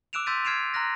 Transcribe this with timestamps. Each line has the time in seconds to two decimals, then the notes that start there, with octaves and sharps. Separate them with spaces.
0.13 D6 E6 F#6 D7 E7 F7
0.26 C6 E6 G6 A6 B6 D#7
0.45 F6 G#6 C7 D7 E7 F7
0.74 A#5 C6 F6 F#6 A#6